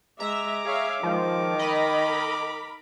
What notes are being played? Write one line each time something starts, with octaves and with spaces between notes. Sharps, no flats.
G#3 E5 A#5 D6
G#4 C#5 E5 F5
D#3 F3 G#3
A#4 D#5 B5